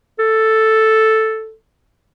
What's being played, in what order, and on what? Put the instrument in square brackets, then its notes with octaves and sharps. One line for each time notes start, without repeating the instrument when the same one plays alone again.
[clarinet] A4